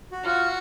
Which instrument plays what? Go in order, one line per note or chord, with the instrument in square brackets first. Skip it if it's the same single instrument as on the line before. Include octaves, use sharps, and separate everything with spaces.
[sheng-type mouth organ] F#4
[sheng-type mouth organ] F4 [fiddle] F#4